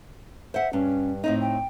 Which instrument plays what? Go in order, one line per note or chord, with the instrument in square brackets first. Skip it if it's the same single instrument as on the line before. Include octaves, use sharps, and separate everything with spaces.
[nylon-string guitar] C5 F#5 [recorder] E5
[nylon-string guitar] G2 [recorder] C#4
[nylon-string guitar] A2 C4 D#4 [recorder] D#5
[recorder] G5